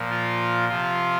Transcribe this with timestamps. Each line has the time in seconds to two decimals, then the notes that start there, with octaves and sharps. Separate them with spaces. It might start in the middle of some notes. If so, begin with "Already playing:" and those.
Already playing: A#2 F3
0.10 F4
0.69 C3 F3 F4